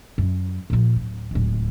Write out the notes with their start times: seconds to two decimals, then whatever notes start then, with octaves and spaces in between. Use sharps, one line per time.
0.18 F#2
0.70 A#2 F3
0.96 D1
1.31 D1 C#2